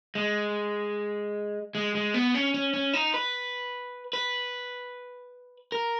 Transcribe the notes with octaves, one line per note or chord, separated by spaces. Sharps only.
G#3
G#3
G#3
B3
C#4
C#4
C#4
D#4
B4
B4
A#4